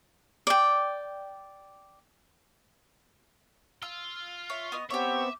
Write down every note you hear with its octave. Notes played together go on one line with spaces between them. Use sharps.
D5 G5
F4 E6
C#5 E5
B3 D#5 C#6
B3 C4 G4 C#5 E5 D6